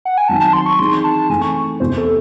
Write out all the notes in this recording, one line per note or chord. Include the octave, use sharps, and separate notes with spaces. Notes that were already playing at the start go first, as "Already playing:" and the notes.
F#5
G#5
D#3 F#3 C4 A5
A5
C6
C#6
E3 C4 D#4 G#4 C6
A5
E3 A3 C4 G#5
C#6
E2 C3 E3 C5
A4